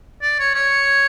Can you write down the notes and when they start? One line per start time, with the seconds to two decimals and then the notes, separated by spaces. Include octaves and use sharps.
0.22 D5
0.40 C#5
0.55 C#5